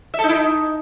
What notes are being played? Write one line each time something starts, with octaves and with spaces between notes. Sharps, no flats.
E5
A4
D#4
E4
D#4